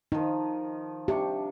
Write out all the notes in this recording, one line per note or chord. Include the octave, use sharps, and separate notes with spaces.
D#3 F3 D#4
C3 D4 G4 C#6